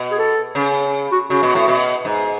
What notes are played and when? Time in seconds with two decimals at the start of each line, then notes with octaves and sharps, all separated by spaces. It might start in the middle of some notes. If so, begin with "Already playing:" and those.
Already playing: B2
0.11 G#4
0.19 A4
0.55 C#3
1.12 F#4
1.30 C#3 F#4
1.43 B2
1.55 A2
1.68 B2
2.05 G#2